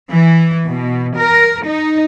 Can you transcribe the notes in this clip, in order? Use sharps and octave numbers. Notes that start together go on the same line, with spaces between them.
E3
B2
A#4
D#4